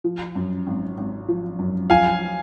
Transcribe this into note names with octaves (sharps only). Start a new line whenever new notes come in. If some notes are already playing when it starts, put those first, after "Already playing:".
F3
F#2
G#1
G#1
F3
F#2
F3 F5 G#5